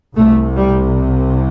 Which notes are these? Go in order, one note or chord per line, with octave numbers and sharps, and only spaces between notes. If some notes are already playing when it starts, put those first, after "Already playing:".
C2 C3 A3
G3